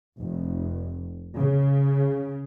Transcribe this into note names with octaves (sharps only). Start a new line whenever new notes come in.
F1
C#3